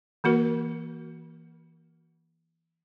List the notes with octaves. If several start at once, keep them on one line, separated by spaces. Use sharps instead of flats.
E3 A#3 F#4 A#4